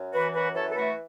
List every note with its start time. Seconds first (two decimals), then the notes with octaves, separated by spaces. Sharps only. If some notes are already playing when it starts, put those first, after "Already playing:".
Already playing: F#2
0.13 E3 F#4 B4
0.34 F#2 F#4 B4
0.55 E3 A4 C#5
0.70 A4
0.75 A3 F#4 B4